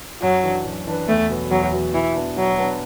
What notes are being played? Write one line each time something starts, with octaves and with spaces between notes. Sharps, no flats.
F#2 F#3
E3 D4 B4
F#2
E3 D4 B4
E2 A3
B2 F#3 B3
E2 F#3
B2 F#3 B3
B2 E3
B3 D4
B2 F#3
B3 D4